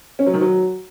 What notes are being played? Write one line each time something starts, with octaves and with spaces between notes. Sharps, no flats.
C#4
F#3
D#3
F#3